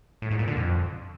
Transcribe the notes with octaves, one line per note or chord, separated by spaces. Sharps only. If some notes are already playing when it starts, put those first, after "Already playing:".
A2
G#2
A#2
D3
F2